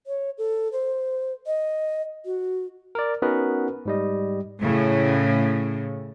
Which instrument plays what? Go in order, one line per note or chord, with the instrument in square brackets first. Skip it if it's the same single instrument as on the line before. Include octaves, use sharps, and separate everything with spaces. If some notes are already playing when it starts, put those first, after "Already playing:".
[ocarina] C#5
A4
C5
D#5
F#4
[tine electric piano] A#4 D5
B3 C#4 D#4 F#4 A#4 B4
G#2 G3 D#5
[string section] A2 C#3